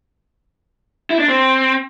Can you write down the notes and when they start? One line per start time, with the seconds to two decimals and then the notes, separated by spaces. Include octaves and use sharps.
1.10 E4
1.19 D4
1.29 C4